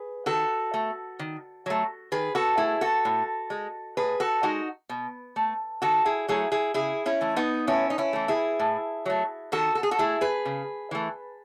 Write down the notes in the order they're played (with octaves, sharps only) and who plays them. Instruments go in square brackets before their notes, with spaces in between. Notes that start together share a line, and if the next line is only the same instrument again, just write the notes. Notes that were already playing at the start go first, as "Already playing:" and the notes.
Already playing: [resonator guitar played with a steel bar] G#4 B4
D#3 F#4 A4
A3
D#3
F#3 A3
D#3 G#4 B4
F#4 A4
A3 E4 G#4
F#4 A4
A2
G#3
A2 G#4 B4
F#4 A4
G#3 D#4 F#4
B2
A3
D#3 F#4 A4
E4 G#4
F#3 A3 E4 G#4
E4 G#4
C#3 E4 G#4
C#4 E4
E3 A3
B3 D#4
A2 C#4 E4
D#4
C#4 E4
E3 A3
E4 G#4
A2
F#3 A3
D#3 F#4 A4
A4
G#4
F#4 A4
A3 E4 G#4
G#4 B4
C#3
E3 A3